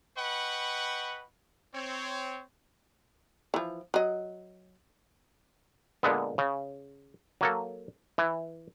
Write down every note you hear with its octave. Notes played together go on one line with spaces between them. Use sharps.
B4 D#5 F#5 G5 B5 C#6
C4 C#5
E3 F3
F#3 D#5
A#2 D3 G#3 B3
C#3
F#3 A#3 A4
E3